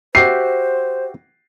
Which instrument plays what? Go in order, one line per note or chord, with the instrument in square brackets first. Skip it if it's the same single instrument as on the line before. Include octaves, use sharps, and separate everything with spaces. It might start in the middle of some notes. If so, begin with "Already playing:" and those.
[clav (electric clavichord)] F#4 G4 E5 [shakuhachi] C5 [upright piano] C7